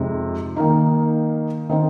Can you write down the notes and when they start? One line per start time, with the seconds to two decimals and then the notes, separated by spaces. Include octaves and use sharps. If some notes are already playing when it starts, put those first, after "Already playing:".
Already playing: F2 C3 G#3 D#4
0.56 D#3 A#3 D#4
1.69 D#3 C4 D#4